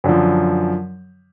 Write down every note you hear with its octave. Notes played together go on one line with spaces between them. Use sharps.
F#2 D3 F3